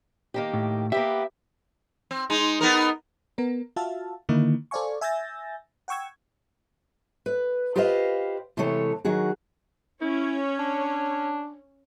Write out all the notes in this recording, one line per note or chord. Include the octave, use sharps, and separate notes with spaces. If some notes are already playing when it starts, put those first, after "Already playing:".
D#3 A#3 G4
A2
A#3 B3 G4 E5
C4
G#3 D#4
B3 D#4 A#4
B3 A#4
F4 F#4 E5 F5 A5
D3 D#3 A#3 D#4 E4
A4 C5 D5 F5 G#5 C#6
E5 G#5 E6 G6 A6 A#6
F#5 G5 C#6 E6 G#6
B4
F4 G4 B4 C5 D#5 F5
C3 E3 G#3 A3 C#5 A5
D#3 F#3 F#4 G#4
C#4 E4 C#5
D4